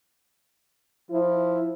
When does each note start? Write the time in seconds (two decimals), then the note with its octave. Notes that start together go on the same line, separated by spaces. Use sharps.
1.10 F3 E4